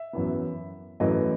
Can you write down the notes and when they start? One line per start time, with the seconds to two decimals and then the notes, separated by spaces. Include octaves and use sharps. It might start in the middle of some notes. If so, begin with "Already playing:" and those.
Already playing: E5
0.13 F#2 E3 B3
1.00 F#2 E3 A3 D#5